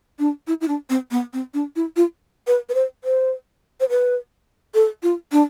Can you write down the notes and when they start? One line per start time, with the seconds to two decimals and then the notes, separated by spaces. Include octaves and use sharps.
0.19 D4
0.47 E4
0.61 E4
0.68 D4
0.90 C4
1.11 B3
1.33 C4
1.54 D4
1.76 E4
1.96 F4
2.47 B4
2.69 B4
2.74 C5
3.04 C5
3.80 C5
3.89 B4
4.74 A4
5.03 F4
5.32 D4